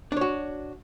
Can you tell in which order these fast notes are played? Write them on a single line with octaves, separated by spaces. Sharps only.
D4 C#5 F#4